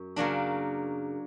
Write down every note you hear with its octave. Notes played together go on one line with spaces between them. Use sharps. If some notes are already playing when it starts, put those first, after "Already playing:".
Already playing: F#2
C#3 F#3 A#3 D4